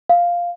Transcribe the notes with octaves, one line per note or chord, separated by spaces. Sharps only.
F5